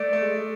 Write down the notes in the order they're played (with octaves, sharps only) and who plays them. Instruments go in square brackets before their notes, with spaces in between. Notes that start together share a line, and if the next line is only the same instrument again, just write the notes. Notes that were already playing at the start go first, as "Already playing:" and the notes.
Already playing: [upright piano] A3 [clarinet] D5
[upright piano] A3
G#3
G#3